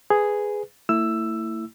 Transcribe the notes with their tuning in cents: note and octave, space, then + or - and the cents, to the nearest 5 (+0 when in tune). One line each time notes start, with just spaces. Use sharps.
G#4 +0 B4 +10
A3 +45 E4 +0 E6 +10